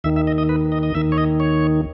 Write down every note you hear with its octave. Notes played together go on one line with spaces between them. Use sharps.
D#2 D#3 E5
E5
D#5
D#5
B4
D#5
D#5
D#2 D#3 E5
C#5
D#5
C#5